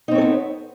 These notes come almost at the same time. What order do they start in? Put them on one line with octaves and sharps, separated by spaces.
D#4 C4 C#5 A4 B3